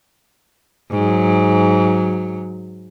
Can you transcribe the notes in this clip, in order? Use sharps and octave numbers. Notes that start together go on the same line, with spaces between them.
G#2 F#3